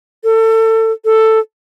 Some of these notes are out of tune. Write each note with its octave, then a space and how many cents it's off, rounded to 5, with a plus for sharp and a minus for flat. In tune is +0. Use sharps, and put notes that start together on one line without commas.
A4 +25
A4 +5